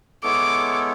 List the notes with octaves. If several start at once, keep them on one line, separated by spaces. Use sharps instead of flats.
G#3 B3 E4 A4 C#5 D6